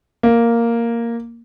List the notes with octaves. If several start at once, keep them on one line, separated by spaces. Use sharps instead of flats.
A#3